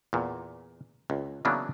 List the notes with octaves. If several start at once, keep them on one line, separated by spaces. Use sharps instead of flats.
E2 A#2
C#2
C#3 E3 F#3 A#3 B3 D4